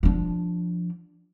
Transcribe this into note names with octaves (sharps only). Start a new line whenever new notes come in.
F3 D4